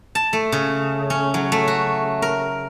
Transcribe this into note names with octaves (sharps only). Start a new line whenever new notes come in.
A5
A3
C#3
C#4
F#3
A3
F#4
A#4